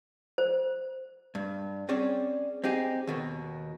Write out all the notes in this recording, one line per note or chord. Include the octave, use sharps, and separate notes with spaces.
C5
G2
C4 C#4 G#4 C#5 D5
C4 D#4 G4 G#4
D#2 B2 D#3